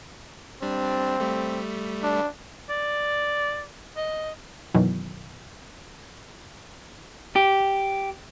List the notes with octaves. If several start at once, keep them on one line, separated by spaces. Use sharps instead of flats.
G3 C4 D4
G3 A3
D4
D5
D#5
F#2 B2 D#3 E3 F#3
G4